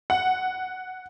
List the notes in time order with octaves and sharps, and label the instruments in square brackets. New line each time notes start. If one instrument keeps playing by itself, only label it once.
[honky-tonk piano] F#5